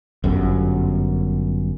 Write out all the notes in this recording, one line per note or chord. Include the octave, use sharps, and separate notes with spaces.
G1 F#2